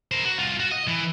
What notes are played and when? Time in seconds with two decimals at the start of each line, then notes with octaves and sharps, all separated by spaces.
0.11 A#4 C5
0.25 F#4
0.39 C2 F4
0.60 F#4
0.72 D#5
0.88 E3